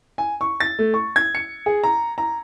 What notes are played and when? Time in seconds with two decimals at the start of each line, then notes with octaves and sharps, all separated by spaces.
0.18 G#5
0.41 C#6
0.60 A6
0.79 A3
0.94 C#6
1.16 G#6
1.35 C#7
1.66 G#4
1.84 A#5
2.18 A#5